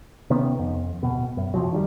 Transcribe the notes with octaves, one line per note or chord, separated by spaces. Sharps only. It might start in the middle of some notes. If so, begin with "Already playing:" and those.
C3 D#3 B3 C#4
F2
D1 B2
F#2
F2 C3 F3 F#3
D#3 F#3 G3